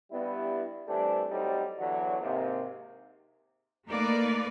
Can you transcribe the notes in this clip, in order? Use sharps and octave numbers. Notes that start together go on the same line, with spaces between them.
G2 G3 B3 E4
E3 G3 A3 C4 D4
A2 F#3 G3 C4 D#4 G4
E2 D3 E3 F#3
G#2 C3 A#3
A3 A#3 D#4 A#4 B4 D5